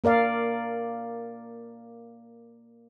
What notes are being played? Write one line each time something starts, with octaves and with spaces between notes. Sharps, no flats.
A#3 A#4 D5 F5